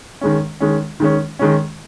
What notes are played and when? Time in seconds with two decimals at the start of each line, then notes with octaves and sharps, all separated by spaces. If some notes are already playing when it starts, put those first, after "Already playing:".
0.21 D#3 G#3 C#4
0.60 D#3 G#3 C#4
1.00 D#3 G#3 C#4
1.39 D#3 G#3 C#4